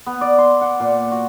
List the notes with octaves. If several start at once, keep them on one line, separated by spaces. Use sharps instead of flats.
B3
D5
C6
F#5
A#2
F#4